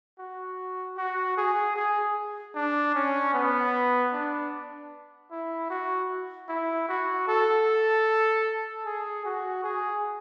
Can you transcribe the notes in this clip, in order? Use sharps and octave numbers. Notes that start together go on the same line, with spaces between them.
F#4
F#4
G#4
G#4
D4
C#4
B3
D4
E4
F#4
E4
F#4
A4
G#4
F#4
G#4